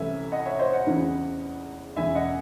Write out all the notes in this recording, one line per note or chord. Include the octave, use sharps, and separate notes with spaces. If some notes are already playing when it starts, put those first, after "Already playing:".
Already playing: C2 C3 E3 A3 C#4 E5 G#5
D#5 F#5
C#5 E5
C5 D#5
D#5 F#5
E2 C#3 E3 C4
E1 E2 C#3 E5 G#5
D#5 F#5